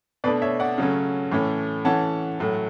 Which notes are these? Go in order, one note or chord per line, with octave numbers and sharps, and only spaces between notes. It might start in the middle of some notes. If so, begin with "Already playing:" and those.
B2 A3 D4 B4 D5
C#5 E5
D5 F#5
C#3 F#3 A3 C#4
A2 E3 A3 C#4
E3 A3 C#4 F#5 A5
A2 F#3 A3